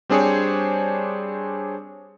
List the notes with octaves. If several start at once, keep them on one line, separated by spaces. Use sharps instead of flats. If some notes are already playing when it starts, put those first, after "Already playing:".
G3 C4 D4 G#4 C5 C#5